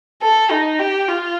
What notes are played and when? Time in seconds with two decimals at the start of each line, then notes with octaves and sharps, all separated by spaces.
0.22 A4
0.51 D#4
0.79 G4
1.08 F4